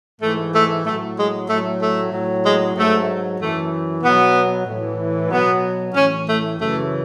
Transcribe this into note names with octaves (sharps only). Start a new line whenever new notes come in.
G#2 E3 A3
A3
A2 A3
F#3
G#3
A2 F#3 A3
A3
A2 F#3
G#3
G#2 F#3 A3
F#2 E3 A3
B2 F#3 B3
A2 E3
B2 F#3 B3
A2 E3 C#4
A3
F#2 C#3 E3 A3